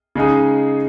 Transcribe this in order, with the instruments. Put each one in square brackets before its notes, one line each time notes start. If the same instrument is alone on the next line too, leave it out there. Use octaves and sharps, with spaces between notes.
[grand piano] C#3 G#3 D#4 G#4